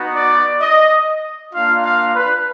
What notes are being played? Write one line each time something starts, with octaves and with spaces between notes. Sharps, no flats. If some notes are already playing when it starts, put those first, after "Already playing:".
Already playing: B3 D#4 F#4
D5
D#5
A#3 D4 F4 F5
F5
B4